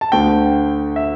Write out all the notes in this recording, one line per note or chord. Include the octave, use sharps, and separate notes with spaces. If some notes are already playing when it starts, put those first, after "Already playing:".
A5
D2 D3 A3 G5
E5